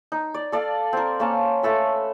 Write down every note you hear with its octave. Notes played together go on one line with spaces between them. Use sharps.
D#4
D5
A4 D5 F5
C4 A#4
A#3 C#4 C#5 A5
A3 A4 B4